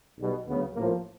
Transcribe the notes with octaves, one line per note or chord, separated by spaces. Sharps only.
B1 B2 G3
D2 C#3 F#3 B3
A1 A2 F3 A#3